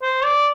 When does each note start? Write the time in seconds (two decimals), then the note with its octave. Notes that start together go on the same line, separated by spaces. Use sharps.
0.02 C5
0.24 D5